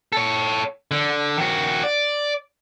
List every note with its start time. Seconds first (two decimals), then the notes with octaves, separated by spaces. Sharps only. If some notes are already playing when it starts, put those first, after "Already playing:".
0.12 A4 C#5
0.91 D3
1.37 D#3 F#4
1.83 D5